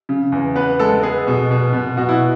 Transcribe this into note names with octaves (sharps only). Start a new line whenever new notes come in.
C#3
E2
B3 B4
G#3 A4
B3 G#4
B2
B2
B2
B2 F#4
E4